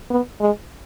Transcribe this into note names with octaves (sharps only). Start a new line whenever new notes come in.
B3
G#3